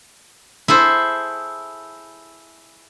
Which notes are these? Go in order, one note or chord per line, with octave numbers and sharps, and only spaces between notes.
E4 G#4 A4 C5